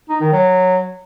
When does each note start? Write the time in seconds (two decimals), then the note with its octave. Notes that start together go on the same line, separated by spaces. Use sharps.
0.09 D#4
0.21 D#3
0.33 F#3